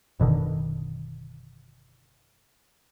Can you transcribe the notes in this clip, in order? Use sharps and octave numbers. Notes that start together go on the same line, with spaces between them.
F#1 B2 D3 D#3